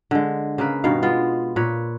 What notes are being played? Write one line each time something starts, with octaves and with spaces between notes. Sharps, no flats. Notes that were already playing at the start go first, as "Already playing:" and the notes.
D3 G#3
C#3 A#3 B4
G2 B2 D#3 F5
G#3 B3 F4
A#2 B4 C#5